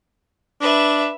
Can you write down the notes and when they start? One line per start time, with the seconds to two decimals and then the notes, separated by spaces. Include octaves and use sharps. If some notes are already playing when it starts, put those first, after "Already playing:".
0.61 D4 B4 E5